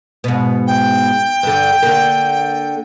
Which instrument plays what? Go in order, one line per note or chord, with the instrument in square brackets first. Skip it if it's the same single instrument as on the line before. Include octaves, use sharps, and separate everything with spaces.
[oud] G#2 B2
[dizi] G5
[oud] G2 D3
D3 A#3